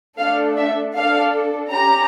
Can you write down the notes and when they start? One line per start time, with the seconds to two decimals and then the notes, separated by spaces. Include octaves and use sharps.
0.19 A3 D4 A4 F5
0.57 E5
0.95 D4 A4 F5
1.72 C#4 G4 A#5